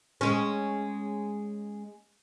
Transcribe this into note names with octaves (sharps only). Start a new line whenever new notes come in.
G#3 C#4